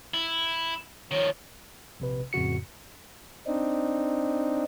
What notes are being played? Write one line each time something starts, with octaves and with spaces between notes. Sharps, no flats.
E4
D#3 F3 C#5
A#1 C3 B4
F2 A2 C#3 F#4 C#7
C4 D4 D#4